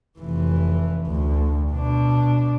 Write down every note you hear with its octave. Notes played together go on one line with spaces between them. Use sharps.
F1 E3
D2
B2 D4